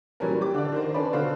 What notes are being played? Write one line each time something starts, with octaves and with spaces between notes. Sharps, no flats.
A#2 E3 F#3 G3 C#4 A#4
G4 D6
D3 D5
D#3 D#4 C5
C#4 D4 A4 B4 D5 B5
B2 D3 C5 F5